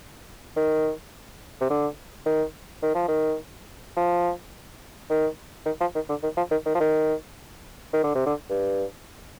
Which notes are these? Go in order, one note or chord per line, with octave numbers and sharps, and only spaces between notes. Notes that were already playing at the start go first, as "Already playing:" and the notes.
D#3
C3
D3
D#3
D#3
F3
D#3
F3
D#3
D#3
F3
D#3
D3
D#3
F3
D#3
D#3
F3
D#3
D#3
D3
C3
D3
G2